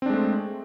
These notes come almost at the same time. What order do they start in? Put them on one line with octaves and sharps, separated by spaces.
C4 D4 G#3 A3